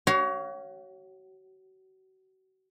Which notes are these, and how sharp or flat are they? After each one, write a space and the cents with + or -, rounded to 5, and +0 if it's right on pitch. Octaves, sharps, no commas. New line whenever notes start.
F#4 +35 C#5 +0 F5 +0